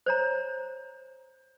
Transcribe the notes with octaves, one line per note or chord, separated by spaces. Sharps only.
C5 C#5 A#5